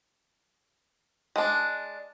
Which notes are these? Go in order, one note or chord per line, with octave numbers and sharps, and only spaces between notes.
G#3 D4